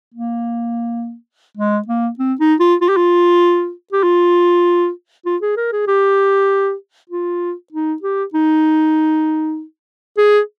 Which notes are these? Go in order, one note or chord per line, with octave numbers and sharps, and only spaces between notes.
A#3
G#3
A#3
C4
D#4
F4
F4
G4
F4
G4
F4
F4
G#4
A#4
G#4
G4
F4
D#4
G4
D#4
G#4